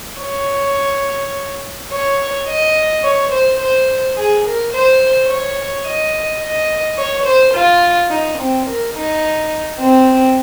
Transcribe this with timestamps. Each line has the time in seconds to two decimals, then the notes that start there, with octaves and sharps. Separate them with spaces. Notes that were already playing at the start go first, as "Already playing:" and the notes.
0.22 C#5
1.91 C#5
2.47 D#5
3.03 C#5
3.32 C5
3.59 C5
4.16 G#4
4.44 A#4
4.73 C5
5.29 C#5
5.85 D#5
6.42 D#5
6.97 C#5
7.26 C5
7.54 F4
8.11 D#4
8.38 C4
8.66 A#4
8.94 D#4
9.79 C4